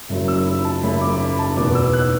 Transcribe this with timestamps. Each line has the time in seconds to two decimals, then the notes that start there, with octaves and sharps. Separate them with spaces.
0.09 F#1 F#2 F#3
0.28 E6
0.45 B5
0.65 A5
0.83 F#1 F#2 F#3 B5
1.01 D6
1.20 B5
1.39 A5
1.57 E2 B2 B3 D6
1.75 E6
1.93 F#6